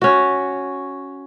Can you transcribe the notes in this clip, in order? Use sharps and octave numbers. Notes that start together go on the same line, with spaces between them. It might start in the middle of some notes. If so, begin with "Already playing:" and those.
C#4 F#4